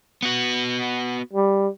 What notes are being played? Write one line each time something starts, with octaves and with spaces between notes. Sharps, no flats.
B3 F#4
G3